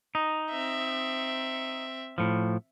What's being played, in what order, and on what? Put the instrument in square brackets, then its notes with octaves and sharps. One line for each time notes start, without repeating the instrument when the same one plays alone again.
[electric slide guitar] D#4
[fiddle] C4 E5
[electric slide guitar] A2 F3